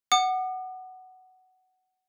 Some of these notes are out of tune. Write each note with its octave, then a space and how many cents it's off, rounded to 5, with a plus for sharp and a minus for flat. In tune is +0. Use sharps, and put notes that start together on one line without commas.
F#5 +10 D6 +45